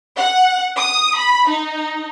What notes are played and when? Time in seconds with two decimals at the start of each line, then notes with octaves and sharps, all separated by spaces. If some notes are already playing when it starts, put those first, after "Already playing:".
0.18 F#5
0.79 D#6
1.17 B5
1.50 D#4